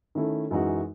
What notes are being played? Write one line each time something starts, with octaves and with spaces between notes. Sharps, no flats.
D#3 A3 C#4 E4 A4
F#2 E3 G#3 D#4 F#4